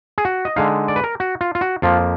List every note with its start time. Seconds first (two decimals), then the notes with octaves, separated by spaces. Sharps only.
0.18 G#4
0.25 F#4
0.45 D#5
0.56 D3 G#3 D#4 F5
0.88 D5
0.96 B4
1.04 A#4
1.20 F#4
1.41 F4
1.55 F4
1.61 F#4
1.82 F2 F3 A#3 F4